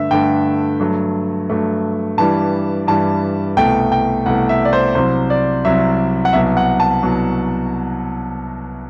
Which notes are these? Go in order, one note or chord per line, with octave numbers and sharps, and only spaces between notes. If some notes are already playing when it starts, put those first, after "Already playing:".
Already playing: G2 D3 A3 E5
G2 D3 A3 G5
G2 F#3 A3
G2 F#3 A3
G2 E3 G3 A5
G2 E3 G3 A5
C2 B2 A3 G5
G5
C2 B2 A3 F#5
E5
D5
C5
C2 C3 F#3 C5
D5
C2 C3 F#3 E5
F#5
C2 B2 F#3 E5
F#5
A5
C2 B2 F#3